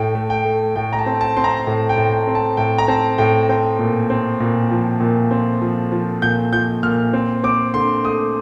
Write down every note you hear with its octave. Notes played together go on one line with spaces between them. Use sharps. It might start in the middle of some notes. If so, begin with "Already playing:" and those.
Already playing: A2 G5
A3
G5
A3
A2 G5
A#5
A5
C4
A5
C4 C6
A#5
A2
G5
A2
G5
C4
A5
A2 G5
A#5
C4 A5
A2 G5
C4 G5
A#2
C4
A#2
F3
A#2
C4
F3
F3
A#2 G6
F3 G6
A#2 F6
C4
C4 D6
D3 C6
A3 D#6